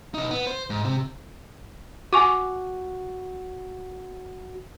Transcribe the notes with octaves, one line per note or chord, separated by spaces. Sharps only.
B2 D#4
B3
C5
G#2
C3
F#4 G#5 C#6 D6